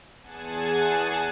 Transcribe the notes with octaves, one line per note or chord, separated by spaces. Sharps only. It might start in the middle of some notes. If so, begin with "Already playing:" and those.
E2 G#4 F#5 G#5 A5 G#6